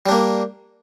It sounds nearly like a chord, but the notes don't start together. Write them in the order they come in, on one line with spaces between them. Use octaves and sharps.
G3 D4 A#3